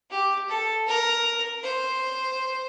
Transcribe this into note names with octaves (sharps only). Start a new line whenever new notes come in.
G4
A4
A#4
C5